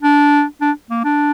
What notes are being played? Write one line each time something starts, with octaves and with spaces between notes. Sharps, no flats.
D4
D4
A#3
D4